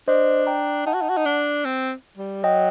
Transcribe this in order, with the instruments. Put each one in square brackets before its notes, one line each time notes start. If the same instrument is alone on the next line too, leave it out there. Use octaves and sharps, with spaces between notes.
[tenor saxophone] D4 [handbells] C5 D#5
[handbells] G5 A#5
[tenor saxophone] D#4 [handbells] F#5 A5
[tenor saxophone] F#4
D#4
F#4
D#4
D4
C4
G3
[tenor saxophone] F#3 [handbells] D#5 G5